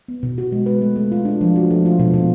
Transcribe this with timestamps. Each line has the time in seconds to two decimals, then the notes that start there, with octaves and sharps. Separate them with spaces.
0.08 B3
0.23 B2
0.38 F#4
0.52 G#3
0.66 B4
0.81 A3
0.96 A3
1.12 F4
1.25 D4
1.41 F3
1.56 F#4
1.71 A3
1.85 F4
1.99 B2
2.14 B2